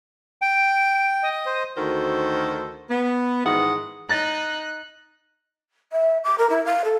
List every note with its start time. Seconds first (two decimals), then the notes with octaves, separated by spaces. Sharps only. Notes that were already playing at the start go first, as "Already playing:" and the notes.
0.42 G5 D7
1.22 D#5
1.46 C5
1.77 D2 D#3 F#4 A4 A#4 C5
2.90 B3
3.45 G#2 D#3 E3 D#5 F#5
4.09 D#4 F#6 A6 A#6
5.92 E5
6.24 D6
6.38 A#4
6.50 E4
6.66 F5
6.85 A4